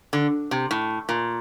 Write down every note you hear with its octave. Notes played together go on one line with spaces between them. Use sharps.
D3
C3
A2
A#2